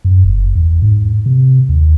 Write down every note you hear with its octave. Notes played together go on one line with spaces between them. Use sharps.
F#2
F#1
E2
G#2
C3
D#2